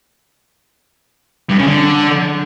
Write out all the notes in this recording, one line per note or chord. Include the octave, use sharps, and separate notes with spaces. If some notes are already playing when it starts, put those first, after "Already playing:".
G2
C#3
D3